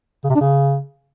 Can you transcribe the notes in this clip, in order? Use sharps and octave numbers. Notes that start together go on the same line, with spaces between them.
C#3
C3
D4
C#3